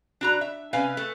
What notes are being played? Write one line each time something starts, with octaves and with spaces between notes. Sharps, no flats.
D4 F#4 A#5
E5
C3 C#4 B4 F5 G#5
A3